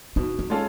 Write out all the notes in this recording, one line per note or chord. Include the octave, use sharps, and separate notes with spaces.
B2 D#4
D#4
G#3 C#4 F4 A4